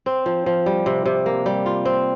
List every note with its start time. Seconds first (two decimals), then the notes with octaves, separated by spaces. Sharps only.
0.06 C4
0.26 F3
0.46 F3
0.66 G3
0.86 C3
1.06 C3
1.26 A#3
1.46 G3
1.66 F4
1.85 C4